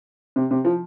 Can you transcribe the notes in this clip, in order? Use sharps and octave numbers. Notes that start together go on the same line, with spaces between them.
C3
C3
F3